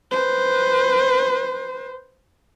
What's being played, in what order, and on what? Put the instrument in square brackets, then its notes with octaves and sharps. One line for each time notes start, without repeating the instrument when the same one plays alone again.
[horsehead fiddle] B4 C5